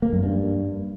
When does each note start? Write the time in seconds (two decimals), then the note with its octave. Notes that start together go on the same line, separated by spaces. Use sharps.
0.02 A#3
0.13 F#2
0.23 G2